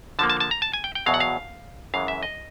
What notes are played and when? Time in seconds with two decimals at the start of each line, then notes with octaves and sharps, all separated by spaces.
0.19 D3 F3 A#3 A5
0.30 A5
0.40 A5
0.51 A#5
0.62 A5
0.73 G#5
0.84 G5
0.95 G5
1.06 E2 B2 F#3 F5
1.14 F#5
1.20 F5
1.94 F#2 C#3 E3 G#3 F5
2.08 E5
2.23 D#5